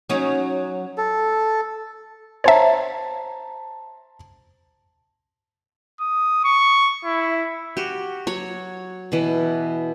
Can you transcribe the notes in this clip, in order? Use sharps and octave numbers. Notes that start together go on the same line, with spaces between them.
F#3 C#4 D#4
A4
C5 C#5 E5 A5 A#5
D#6
C#6
E4
F#4 G4
F#3 C#5
B2 E3